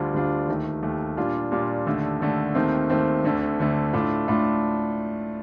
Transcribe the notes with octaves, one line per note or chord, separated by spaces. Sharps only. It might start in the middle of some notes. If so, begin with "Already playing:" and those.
Already playing: D2 D3 G3 D4 F4
D2 D3 G3 D4 F4
D#2 D#3 A3
D#2 D#3 A3
A#2 G3 D4 F4
A#2 G3 D4 F4
D#2 D3 A3
D#2 D3 A3
D#2 D#3 A3 C4
D#2 D#3 A3 C4
D2 D3 A3
D2 D3 A3
A2 A3 D4 F4
A2 A3 D4 F4